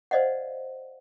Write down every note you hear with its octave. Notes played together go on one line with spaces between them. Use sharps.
C5 D5 D#5 F5 F#5